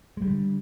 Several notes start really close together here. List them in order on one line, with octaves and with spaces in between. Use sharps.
G#3 G3 D3